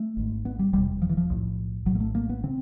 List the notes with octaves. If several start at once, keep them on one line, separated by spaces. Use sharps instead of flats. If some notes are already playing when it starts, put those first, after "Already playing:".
Already playing: A3
G#1 G#2
B3
G3
F1 E2 C3 G3
F3
E3
F3
B1 A2
A#1 A2 F#3
A#3
A3
A#3
B3
C#3 C4